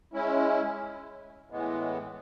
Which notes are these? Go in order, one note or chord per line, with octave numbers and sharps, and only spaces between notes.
G#3 C#4 E4
A2 E3 G#3 B3